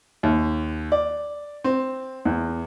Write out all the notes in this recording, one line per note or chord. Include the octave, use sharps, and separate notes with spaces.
D#2
D5
C4
E2